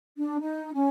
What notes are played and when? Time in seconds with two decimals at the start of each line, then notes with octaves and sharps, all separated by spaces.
0.17 D4
0.40 D#4
0.74 C#4